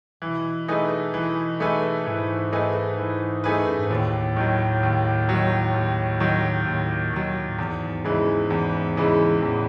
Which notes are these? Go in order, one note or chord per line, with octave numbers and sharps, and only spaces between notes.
B2 E3
A3 D#4 G#4 B4
E3
A3 D#4 G#4 B4
G#2 E3
A3 D#4 G#4 B4
E3
A3 D#4 G#4 B4
F#2
G#2
D#2 A2
D#3 F#3
D#2
D#3 F#3
D#2
D#3 F#3
D#2 A2
B2 D#3 F#3
A2
E2 G#2
C#3 E3 G#3
E2
C#3 E3 G#3
E2 A2